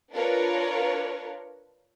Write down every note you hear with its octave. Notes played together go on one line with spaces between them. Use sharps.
D4 F4 A#4 B4 C#5